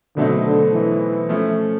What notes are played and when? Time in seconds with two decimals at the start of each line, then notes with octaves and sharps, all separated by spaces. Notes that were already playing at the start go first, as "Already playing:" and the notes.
0.16 B2 D3 F#3 A3 C4 D#4
0.44 D3
0.73 E3
1.29 F3 A3 C#4